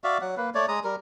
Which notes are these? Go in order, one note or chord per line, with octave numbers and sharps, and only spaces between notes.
F#4 D5 E5 F5
F#3 F#5
A#3 B4
A3 C#5 D5
G#3 A#5 D#6
G3 A#4